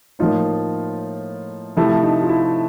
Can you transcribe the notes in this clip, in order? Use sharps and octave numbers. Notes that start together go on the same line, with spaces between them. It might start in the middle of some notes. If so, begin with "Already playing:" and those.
A2 F3 A#3 D#4 F4
C3 F3 A3 E4
D#4
F4
E4